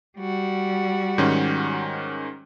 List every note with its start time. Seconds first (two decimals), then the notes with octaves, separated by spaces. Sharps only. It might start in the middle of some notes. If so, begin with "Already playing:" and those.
0.17 G3 F#4
1.18 G#2 D#3 C#4